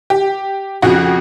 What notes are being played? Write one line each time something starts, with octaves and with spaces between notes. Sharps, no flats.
G4
F2 C#3 F3 F#4